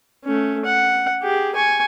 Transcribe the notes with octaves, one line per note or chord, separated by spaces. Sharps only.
A3 C#4
F#5
G4 G#4
G#5 C#6